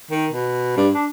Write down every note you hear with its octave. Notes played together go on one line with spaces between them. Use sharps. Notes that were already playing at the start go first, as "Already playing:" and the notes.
D#3
B2
G2
D4